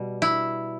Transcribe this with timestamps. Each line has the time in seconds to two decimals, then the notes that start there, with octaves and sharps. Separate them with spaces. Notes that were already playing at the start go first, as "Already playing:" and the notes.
Already playing: B2 G3
0.22 E4